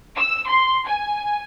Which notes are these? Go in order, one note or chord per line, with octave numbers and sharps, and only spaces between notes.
E6
C6
G#5